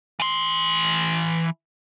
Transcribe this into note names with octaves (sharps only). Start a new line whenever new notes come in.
E3 C6